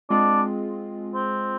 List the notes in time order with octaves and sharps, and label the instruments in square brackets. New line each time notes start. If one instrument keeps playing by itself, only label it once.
[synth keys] G#3 C4 F4 G#4 [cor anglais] D4
[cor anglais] C4